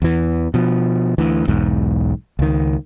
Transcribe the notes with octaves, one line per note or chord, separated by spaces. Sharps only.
E2 E3
B2 F3
D2 E3
B1 E2 G#2
C#2 D#3